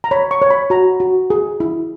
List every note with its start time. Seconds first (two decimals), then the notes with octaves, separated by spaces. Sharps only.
0.04 A#5
0.11 C#5 B5
0.31 C#6
0.42 C#5
0.50 B5
0.70 F#4 A#5
1.00 F#4
1.30 G#4
1.60 E4